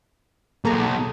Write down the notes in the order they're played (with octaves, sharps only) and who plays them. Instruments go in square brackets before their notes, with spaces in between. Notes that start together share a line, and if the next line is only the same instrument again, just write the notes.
[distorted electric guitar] B1 [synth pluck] A#3 A#5 [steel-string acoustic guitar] G#4 A4